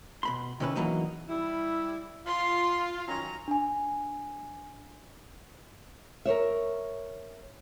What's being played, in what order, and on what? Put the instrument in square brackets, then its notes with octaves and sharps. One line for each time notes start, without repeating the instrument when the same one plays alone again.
[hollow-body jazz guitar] B2 B5 C6
C3 D#3 C#4 E4 B4
E2 E3 F#3 A#3 D#4
[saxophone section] G3 E4
[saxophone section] F4 [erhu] C6
[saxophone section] D#3 F#3 C#4 [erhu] A#5
[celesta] D4 G#5
[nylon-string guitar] A#4 C5 C#5 E5